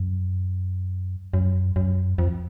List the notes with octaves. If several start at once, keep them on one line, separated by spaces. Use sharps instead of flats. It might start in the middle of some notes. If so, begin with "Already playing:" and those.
Already playing: F#2
F#2
F#2
F2